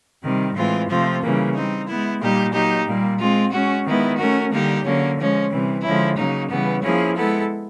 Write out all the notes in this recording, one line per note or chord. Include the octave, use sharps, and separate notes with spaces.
C3 D#3 G3
A2 E3 G#3 C4 F4
C3 F3 A3 C4 F4
C#3 E3 G3 A#3
G3 C4 D#4
G#3 B3 E4
A#2 G3 A#3 D#4 G4
F#3 A#3 D#4 G4
A#2 G3 A#3
G#3 C4 F4
G#3 C#4 F#4
D#3 G#3 B3 E4
A3 C#4 F#4 A#4
D3 G3 A#3 D#4 G4
D3 F#3 A#3 C#4
F3 G#3 C#4
C3 E3 G3
D3 F3 G#3 C#4 E4
C#3 F#3 A#3 D#4
C#3 E3 G3 B3
F3 A#3 C#4 E4 G#4
G#3 B3 E4 A4